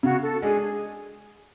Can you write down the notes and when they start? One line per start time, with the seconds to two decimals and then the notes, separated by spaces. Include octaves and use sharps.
0.03 C#3 F#4
0.22 A4
0.42 G#3 D4 G#4
0.63 G#4